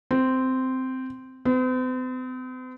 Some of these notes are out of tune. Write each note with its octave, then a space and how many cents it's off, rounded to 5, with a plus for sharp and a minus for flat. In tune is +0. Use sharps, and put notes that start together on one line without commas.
C4 -10
C4 -45